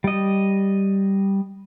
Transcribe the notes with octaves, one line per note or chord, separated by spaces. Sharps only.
G3 D#5